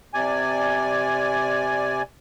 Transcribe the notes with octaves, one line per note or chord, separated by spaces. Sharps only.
C3 D5 G#5